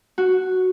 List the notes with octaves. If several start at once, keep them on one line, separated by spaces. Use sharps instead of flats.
F#4